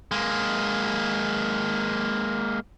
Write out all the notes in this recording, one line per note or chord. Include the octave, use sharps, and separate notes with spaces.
G#3 A#3